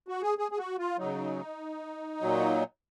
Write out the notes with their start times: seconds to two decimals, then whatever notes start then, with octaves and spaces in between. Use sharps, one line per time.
0.08 F#4
0.22 G#4
0.38 G#4
0.52 G#4
0.58 F#4
0.79 F4
0.98 C#3 F#3 D#4
2.21 A#2 F#3